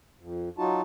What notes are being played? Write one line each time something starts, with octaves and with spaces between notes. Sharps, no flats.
F2
F#3 D#4 F4 F#4 A5